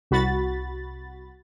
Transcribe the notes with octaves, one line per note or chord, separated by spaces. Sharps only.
C2 F#4 B5 A6